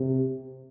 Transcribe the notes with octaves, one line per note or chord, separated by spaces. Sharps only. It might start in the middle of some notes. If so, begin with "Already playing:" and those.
Already playing: C3